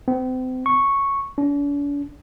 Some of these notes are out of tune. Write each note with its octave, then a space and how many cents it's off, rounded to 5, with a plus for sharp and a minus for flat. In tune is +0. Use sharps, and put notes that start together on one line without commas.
C4 -35
C#6 -5
D4 -45